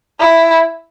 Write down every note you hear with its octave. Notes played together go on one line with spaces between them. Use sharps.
E4